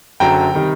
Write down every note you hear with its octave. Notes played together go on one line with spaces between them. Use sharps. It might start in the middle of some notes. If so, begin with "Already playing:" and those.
F#1 F#2 D3 F#3 G5 A#5
C3 D#3 G3